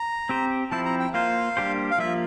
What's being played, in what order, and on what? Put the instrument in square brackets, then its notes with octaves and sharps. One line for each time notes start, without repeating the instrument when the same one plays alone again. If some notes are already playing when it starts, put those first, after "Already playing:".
Already playing: [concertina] A#5
[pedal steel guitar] C4 G4 C5
[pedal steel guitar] F3 C4 E4 [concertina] A5
[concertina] A#5
G5
[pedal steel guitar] A#3 F4 C5 [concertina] F5
[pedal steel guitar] G3 A#3 D4 G4 C5
[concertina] F5
[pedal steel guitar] F3 A#3 F4 [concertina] E5